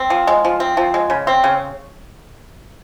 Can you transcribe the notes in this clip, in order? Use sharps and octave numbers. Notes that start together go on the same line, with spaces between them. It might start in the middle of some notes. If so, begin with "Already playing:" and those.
Already playing: C4
F3
G#3
F3
C4
F3
G#3
C#3
C4
C#3